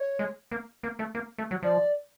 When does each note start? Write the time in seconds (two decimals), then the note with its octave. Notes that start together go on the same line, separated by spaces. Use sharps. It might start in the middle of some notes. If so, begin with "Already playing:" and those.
Already playing: C#5
0.19 G#3
0.51 A#3
0.83 A#3
0.99 A3
1.15 A#3
1.38 A3
1.51 F#3
1.62 F3 D5